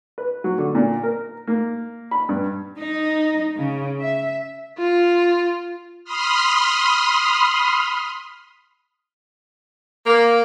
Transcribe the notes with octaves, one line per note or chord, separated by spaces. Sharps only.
B4
F#3
D3
A#2
A#4
A#3
B5
G2
D#4
C#3
E5
F4
B5 C6 D#6 F6
A#3